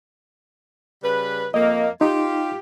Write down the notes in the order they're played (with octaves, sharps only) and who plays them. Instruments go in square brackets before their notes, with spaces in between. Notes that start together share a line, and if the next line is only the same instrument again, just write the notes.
[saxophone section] C#3 G3 B4
[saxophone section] F2 A#3 [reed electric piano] D#5
[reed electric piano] D#4 [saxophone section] F4 G4